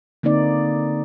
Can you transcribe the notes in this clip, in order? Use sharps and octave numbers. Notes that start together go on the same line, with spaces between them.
D3 A#3 C4 D#4 D5